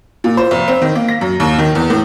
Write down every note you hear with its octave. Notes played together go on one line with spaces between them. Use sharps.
A#2
C5
F1
C4
D#3
A#3
A#6
F#2
D#2
D#3
E2
A2